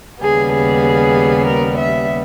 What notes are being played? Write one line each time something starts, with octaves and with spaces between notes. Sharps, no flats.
D#2 C#3 G3 B3 G#4
G#4
A#4
E5